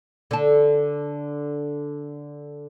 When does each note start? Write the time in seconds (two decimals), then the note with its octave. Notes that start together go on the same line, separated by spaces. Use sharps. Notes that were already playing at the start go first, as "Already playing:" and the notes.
0.31 D3 A4